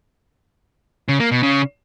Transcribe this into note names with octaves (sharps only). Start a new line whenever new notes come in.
C#3
A#3
B2
C#3